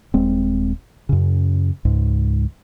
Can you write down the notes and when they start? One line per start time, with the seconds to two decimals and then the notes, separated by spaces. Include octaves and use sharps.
0.14 D#1 G#3 C4
1.09 F#2 C#3
1.85 C#2 G#2